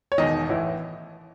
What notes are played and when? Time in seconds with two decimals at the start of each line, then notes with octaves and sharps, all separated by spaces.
0.12 C#5
0.18 E1 E2 D#3 D#5
0.49 A1 A2 E3 E4